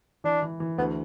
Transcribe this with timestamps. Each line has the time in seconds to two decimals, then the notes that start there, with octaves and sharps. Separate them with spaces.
0.24 E3 D4
0.42 E3
0.60 E3
0.78 D2 B3